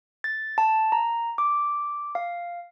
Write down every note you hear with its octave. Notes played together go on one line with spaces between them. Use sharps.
A6
A5
A#5
D6
F5